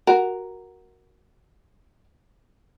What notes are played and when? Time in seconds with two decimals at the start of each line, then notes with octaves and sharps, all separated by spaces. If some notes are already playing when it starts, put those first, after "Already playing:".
0.07 F#4 A#4